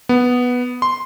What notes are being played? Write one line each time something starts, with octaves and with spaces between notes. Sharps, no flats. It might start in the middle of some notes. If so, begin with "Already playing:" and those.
B3
C6